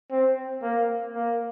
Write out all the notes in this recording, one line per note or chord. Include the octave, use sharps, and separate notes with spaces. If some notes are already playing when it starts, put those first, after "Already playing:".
C4
A#3
A#3